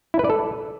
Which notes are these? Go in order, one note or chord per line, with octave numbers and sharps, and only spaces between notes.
E4
B4
D5
A4